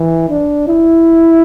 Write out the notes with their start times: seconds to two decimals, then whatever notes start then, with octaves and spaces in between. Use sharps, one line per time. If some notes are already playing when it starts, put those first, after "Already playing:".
Already playing: E3
0.29 D4
0.68 E4